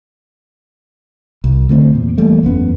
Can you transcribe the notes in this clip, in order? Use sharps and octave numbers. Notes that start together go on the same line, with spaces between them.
C2
D3 A3 B3 C4
E2 A#2
E3 G3 A3 A#3
F#1 E2 B3 C#4